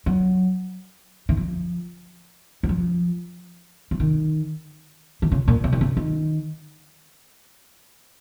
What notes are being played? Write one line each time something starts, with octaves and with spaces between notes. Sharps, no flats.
F#3
D#3
F3
F#3
F3
F3
D#3
D#3
C#3
A#2
C3
D#3
C#3
D#3